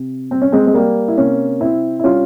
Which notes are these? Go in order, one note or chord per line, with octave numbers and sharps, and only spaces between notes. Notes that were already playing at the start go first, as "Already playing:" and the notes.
Already playing: C3
G3 C4
C#4
G#3 C4
G#3
G3 A#3
E4
C3 A#3 C#4
C3 C4 E4
E4
G3 C#4 F4